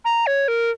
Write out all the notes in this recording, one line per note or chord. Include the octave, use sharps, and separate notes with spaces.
A#5
C#5
A#4